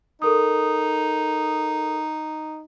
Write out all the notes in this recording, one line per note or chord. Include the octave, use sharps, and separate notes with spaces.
D#4 A4 A#4 D#6